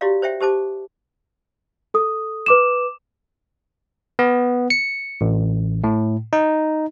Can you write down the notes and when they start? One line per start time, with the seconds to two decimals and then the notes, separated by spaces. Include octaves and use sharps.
0.01 E4 F#4 G4 C#5 D5 F5
0.22 C5 C#5 E5 G5
0.40 G4 C5 A5 D6
1.94 A4 D#6
2.46 B4 D6 E7
4.19 B3
4.70 C#7
5.21 A1
5.84 A2
6.33 D#4